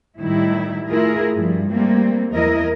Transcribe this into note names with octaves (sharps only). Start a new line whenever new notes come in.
A2 D#3 G3 E4
A3 E4 F4 G#4 A#4
G2 F3 G3
G3 A3 A#3 C4
E2 E3 E4 A#4 D#5